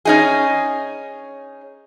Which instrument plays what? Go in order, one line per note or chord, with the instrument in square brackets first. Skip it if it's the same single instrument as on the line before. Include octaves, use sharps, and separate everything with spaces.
[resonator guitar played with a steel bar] C#4 D#4 G#4